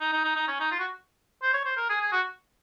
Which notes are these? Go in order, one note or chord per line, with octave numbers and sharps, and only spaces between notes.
D#4
D#4
D#4
D#4
C#4
D#4
F4
F#4
C5
C#5
C5
A#4
G#4
G#4
F#4